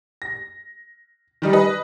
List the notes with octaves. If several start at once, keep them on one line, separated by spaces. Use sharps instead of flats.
A#6
D#3 G3 D#4
B4 D#5